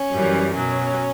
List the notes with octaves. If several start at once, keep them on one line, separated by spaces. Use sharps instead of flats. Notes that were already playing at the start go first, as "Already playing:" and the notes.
Already playing: C#4
F#2 E3 G3
B2 F#3 C#4